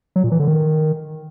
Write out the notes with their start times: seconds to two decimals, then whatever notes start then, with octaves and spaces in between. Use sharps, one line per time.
0.16 F#3
0.24 A#2
0.32 E3
0.39 D3
0.47 D#3